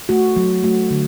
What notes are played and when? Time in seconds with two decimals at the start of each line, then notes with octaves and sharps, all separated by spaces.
0.09 A3 F#4
0.36 F#3
0.64 A3 F#4
0.91 D3